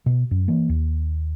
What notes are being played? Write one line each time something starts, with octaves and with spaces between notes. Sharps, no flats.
B2
F#2
E3 A#3
D#2